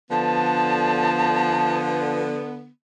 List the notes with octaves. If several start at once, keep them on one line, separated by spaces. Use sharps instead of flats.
D3 F3 B3 A5